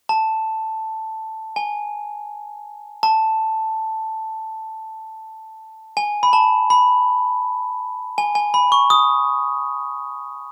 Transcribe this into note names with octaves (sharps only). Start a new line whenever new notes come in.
A5
G#5
A5
G#5
B5
A5
B5
G#5
G#5
B5
C#6
D#6